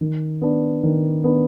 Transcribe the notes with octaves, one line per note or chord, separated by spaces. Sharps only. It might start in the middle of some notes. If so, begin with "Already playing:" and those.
D#3
B3 D4
D#3
B3 D4